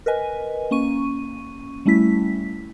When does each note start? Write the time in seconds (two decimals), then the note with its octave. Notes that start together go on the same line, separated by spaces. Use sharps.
0.06 A#4 B4 D#5 G#5
0.71 A#3 C#4 C#6 D#7
1.85 G3 A3 C#4 E4 B6